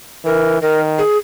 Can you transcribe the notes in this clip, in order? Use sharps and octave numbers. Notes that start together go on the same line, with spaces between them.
E3 A#4
D#3 A#4
G#4